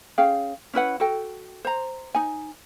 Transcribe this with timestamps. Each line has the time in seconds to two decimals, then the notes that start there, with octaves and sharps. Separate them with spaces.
0.18 C#4 G#4 F5 G5
0.74 C#4 E4 B4 F#5
1.00 F#4 A4 G5
1.65 C5 A#5
2.15 D#4 G#5